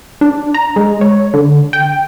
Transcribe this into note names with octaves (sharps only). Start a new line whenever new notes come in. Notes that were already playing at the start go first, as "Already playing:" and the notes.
D4
A#5
G#3
C#5
D3
G5